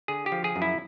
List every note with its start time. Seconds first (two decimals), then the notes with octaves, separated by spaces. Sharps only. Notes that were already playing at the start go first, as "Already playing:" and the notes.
0.08 D3 G#4
0.26 G4
0.32 F3
0.44 G#4
0.56 F#2
0.62 E4